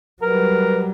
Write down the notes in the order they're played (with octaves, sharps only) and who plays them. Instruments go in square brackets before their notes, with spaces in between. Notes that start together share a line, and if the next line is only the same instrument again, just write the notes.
[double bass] F#3 G3 [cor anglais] A#4 [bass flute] B4